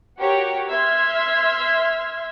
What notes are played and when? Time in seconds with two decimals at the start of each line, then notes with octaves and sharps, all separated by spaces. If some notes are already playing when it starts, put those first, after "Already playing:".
0.19 F#4 G4 A#4 C#5 F#5
0.70 E5 C6 F6 G#6